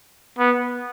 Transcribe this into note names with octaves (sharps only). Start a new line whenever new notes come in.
B3